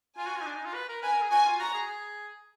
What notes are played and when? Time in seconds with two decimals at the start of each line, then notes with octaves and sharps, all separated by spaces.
0.17 F4 G#5
0.27 F#4
0.36 F4
0.41 D#4
0.45 D4
0.55 D#4
0.65 F4
0.74 B4
0.89 A#4
1.02 B4 G#5
1.12 A#4
1.22 G#4
1.31 F#4 G#5
1.46 F4
1.60 F#4 A#5
1.74 G#4
1.88 G#4